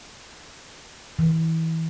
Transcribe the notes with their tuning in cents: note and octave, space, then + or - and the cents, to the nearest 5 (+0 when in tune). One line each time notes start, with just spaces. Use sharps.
E3 -25